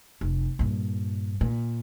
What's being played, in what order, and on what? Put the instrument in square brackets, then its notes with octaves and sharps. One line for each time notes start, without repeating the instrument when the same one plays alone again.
[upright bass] F1
G2 A#2
A#2